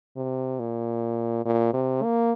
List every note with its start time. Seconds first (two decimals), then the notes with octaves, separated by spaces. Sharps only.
0.17 C3
0.60 A#2
1.46 A#2
1.73 C3
2.03 A#3